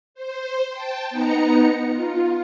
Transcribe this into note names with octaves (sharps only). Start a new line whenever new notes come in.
C5
G5 A5
B3 D#4 A#5 C#7
F4